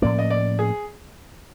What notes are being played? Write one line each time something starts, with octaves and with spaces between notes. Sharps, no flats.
A2 F3 A#3 C#4 D5
D#5
D5
G#4